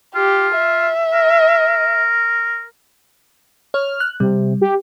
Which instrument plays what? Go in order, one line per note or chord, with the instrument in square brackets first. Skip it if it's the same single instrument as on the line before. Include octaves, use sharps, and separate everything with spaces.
[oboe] F4 [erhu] G4
[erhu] E5
[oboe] A#4
[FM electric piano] C#5 [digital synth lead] F6
[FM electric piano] F#6
[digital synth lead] C3 [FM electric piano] G3
[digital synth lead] G4